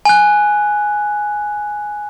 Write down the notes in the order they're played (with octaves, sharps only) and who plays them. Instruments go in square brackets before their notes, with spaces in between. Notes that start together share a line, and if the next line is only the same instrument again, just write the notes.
[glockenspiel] G#5 F#6